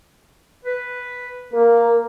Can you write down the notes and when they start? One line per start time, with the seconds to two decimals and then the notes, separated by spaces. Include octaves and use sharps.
0.65 B4
1.53 A#3 A#4